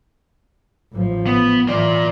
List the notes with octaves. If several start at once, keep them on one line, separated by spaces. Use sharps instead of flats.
A1 F3
B3
A2 E3 F4 D5